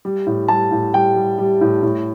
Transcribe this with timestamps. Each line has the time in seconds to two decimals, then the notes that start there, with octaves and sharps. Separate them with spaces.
0.05 G3
0.26 A2
0.48 G3 A5
0.71 A2
0.94 G3 G5
1.16 G3
1.38 G3
1.61 A2
1.82 A2